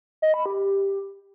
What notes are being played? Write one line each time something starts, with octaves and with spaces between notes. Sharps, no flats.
D#5
B5
G4